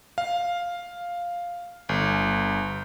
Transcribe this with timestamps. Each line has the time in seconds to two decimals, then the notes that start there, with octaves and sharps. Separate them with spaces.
0.18 F5
1.89 G1